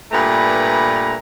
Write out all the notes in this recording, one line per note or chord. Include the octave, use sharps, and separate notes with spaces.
G2 A#2 A3 B4 A#5 B5